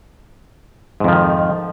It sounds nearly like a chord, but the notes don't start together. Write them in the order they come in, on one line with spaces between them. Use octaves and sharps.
G#2 F2 F3 D#3